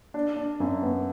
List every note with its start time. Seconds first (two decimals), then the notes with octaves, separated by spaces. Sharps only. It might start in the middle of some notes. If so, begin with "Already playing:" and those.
0.14 D4
0.36 D4
0.60 F#2
0.82 B3